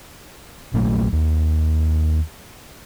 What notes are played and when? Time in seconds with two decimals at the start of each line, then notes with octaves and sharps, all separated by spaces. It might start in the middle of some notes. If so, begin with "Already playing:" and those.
0.74 A#1 A#2 F#3 A3
1.13 D#2